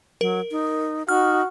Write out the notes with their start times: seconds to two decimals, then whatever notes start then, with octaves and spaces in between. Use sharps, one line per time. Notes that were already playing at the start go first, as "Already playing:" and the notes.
0.21 F#3 A#4
0.51 D#4
1.09 D#4 F#4 F6